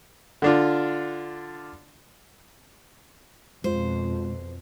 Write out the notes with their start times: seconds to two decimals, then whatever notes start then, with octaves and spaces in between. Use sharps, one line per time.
0.42 D3 D4 F4
3.64 F2 B2 G#3 F4 C5